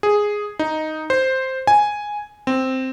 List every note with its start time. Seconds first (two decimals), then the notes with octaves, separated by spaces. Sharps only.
0.03 G#4
0.59 D#4
1.10 C5
1.67 G#5
2.47 C4